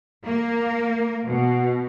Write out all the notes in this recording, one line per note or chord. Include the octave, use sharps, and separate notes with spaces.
A#3
B2